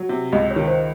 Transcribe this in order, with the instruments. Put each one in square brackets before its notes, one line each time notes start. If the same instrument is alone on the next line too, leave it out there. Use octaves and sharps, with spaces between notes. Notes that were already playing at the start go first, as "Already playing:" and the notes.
Already playing: [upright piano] F#3
C3
[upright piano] C#2 [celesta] D#5
[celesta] C#5
[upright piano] D#3
[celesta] C5